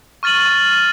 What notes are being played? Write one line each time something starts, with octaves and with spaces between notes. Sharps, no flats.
C#6 F6 A6 D#7 F#7